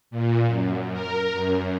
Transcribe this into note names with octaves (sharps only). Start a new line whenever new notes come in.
A#2
F#2
A#4
F#2